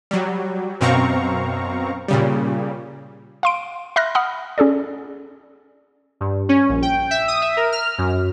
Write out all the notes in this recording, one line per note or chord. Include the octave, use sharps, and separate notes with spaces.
F#3 G3
F#2 B2 C4 F5 A#5 C#6
A#2 C#3 G3
F5 C6 D7
E5 B5 C6 F6 F#6 A#6
F#5 B5 D#6 F6
C#4 G#4 A4 D5
G2
C#4
A#1
G5
E5
D#6
E5
A#4
F6
F#2